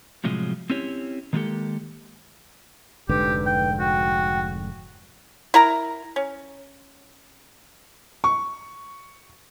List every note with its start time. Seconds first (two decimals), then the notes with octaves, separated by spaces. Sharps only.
0.24 A2 C3 F3 F#3 G#3
0.70 C4 C#4 E4 G4 C#5
1.33 D#3 G#3 A#3 F4 G4 A4
3.09 F1 G#2 D3 G4 B4
3.46 G5
3.80 F#4 G5
5.54 E4 A#4 A#5
6.16 C#4
8.24 C#6